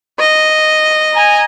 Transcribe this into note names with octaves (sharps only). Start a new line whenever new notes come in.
D#5
G#5 A#5